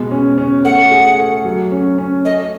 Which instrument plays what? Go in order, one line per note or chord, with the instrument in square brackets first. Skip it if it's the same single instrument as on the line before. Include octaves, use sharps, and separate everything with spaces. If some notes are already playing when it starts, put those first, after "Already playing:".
Already playing: [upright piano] B2 G#3
C#4
C#4
[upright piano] A3 [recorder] F#5
[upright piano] G#4
A3
F#3
C#4
C#4
[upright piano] A3 [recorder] D#5